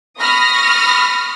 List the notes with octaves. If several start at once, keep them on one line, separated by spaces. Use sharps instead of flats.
B5 C#6 D#6 F6 A#6